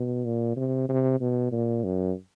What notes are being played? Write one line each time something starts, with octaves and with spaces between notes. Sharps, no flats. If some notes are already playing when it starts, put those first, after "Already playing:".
Already playing: B2
A#2
C3
C3
B2
A#2
F#2